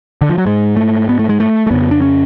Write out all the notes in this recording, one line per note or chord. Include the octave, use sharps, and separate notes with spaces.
D3
F3
F#3
G#2 G#3
A3
B3
A3
G#3
A3
A3
F2 C#3 B3
D4
C#4